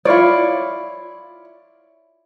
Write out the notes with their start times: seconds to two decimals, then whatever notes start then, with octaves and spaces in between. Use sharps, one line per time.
0.05 E4 F4 C#5 D5